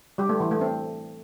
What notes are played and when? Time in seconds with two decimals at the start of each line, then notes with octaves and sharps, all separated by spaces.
0.18 G3 G4
0.29 A3
0.40 E3
0.51 A3
0.61 C4